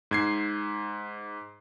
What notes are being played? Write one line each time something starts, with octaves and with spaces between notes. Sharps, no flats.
G#2 G#6 C7